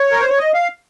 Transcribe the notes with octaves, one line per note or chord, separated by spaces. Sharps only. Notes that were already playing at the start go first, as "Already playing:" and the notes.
Already playing: C#5
A#4
C5
C#5
D#5
F5